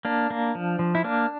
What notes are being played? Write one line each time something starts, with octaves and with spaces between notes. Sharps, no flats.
A#3 D4
A#3
F3
F3
E4
A#3 D4